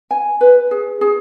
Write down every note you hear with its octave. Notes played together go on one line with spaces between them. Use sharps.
G#5
B4
G#4
G#4